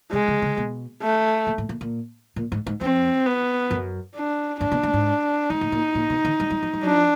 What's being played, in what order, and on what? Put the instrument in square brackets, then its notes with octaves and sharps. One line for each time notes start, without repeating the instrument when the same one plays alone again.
[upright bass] C3 [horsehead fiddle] G#3
[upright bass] C#3
C#3
B2
[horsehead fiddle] A3
[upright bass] A#2
A2
A#2
A#2
A#2
G#2
G#2
[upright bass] F2 [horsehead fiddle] C4
[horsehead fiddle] B3
[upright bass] F#2
[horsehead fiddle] D4
[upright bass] G2 [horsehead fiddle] D4
[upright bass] B2
A2
G#2
[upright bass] G#2 [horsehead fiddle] D#4
[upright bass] A2
A#2
A#2
B2
D#3
G3
G3
F#3
G3
[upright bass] F#3 [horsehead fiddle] D4
[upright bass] F3